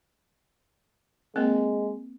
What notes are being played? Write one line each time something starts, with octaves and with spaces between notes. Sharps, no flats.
G#3 A#3 C4 A#4